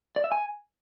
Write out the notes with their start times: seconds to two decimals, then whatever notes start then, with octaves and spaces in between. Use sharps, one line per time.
0.16 D5
0.24 E5
0.32 G#5